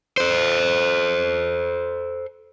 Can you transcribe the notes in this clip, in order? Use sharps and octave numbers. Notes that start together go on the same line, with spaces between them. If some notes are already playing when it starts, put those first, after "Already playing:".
A4 C5